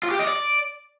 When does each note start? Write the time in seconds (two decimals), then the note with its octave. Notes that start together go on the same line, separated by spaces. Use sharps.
0.03 F4
0.11 G4
0.19 D#5
0.27 D5